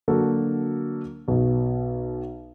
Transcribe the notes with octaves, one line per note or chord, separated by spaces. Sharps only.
D3 F#3 A#3 F#4 A4
B1 B2